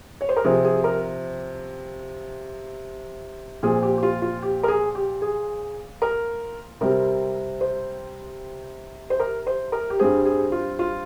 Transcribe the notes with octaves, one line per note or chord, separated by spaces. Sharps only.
C#5
C5
A#4
C3 F3 C4 G#4
G#4
A#4
A#2 F3 C4 G#4
G4
G4
F4
F4
G4
A#4
G#4
G4
G#4
A#4
C3 G3 C4 A#4
C5
C5
A#4
C5
A#4
G4
G2 G3 C4 G#4
G#4
F4
F4